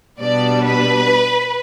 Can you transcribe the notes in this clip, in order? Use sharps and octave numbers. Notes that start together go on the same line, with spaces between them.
B2 G3 B3 D4 D5
B4